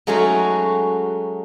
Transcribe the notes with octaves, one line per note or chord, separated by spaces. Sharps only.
F#3 G#3 A3 C#4 D#4 F#4